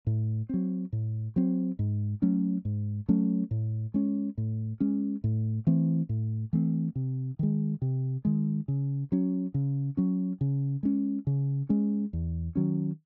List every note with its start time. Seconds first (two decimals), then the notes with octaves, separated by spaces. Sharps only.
0.07 A2
0.49 F#3 C4
0.93 A2
1.36 F#3 C4
1.79 G#2
2.22 F#3 A3 C#4
2.65 G#2
3.09 F#3 A3 C#4
3.51 A2
3.94 G#3 C#4
4.38 A2
4.80 G#3 C#4
5.24 A2
5.67 E3 A3 C4
6.09 A2
6.53 E3 A3 C4
6.96 C3
7.39 D#3 G#3
7.82 C3
8.25 D#3 G#3
8.68 C#3
9.12 F#3 C#4
9.54 C#3
9.97 F#3 C#4
10.41 C#3
10.83 G#3 C#4
11.27 C#3
11.69 G#3 C#4
12.13 E2
12.55 D#3 F#3 C#4